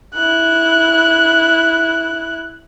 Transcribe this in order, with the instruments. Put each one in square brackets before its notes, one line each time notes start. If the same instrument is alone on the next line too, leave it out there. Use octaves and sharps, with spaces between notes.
[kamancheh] E4 F#6